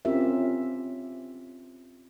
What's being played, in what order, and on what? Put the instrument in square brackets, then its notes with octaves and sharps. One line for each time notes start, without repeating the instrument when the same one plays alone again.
[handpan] C4 C#4 F4 G4 A#4 E5